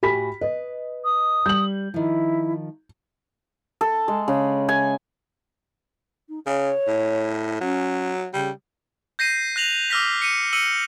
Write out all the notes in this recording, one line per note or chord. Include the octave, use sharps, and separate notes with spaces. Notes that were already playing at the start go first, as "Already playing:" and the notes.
A2 F#4 G4 G#5 B5 B6
B4 D#5
D#6
G3 G6 F#7
D#3 F3 E4
A4
G#3
C#3
G#5
D#4
C#3 C#5
A2
F#3 C#4
C#3 G3
G6 A#6 C7 D#7
F#6 A#6 F7 F#7
D6 E6 F6 A#6 B6
C#7 D#7
E6 C#7 D#7 F#7